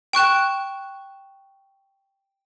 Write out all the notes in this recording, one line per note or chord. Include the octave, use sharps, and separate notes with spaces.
G5 C#6 F#6 E7